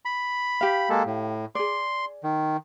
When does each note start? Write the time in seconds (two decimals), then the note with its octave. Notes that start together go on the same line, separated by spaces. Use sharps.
0.05 B5
0.61 G4 F5
0.90 G#3 A#3 A4
1.06 A2
1.55 G#4 D5 C6
2.24 D#3